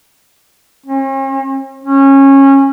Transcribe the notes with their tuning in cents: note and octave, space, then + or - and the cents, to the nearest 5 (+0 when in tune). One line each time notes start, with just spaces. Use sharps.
C#4 -45
C#4 -20